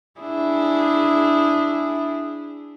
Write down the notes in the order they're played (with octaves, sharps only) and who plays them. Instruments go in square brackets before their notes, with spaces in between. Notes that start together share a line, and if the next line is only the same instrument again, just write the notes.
[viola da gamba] D4 E4 G#4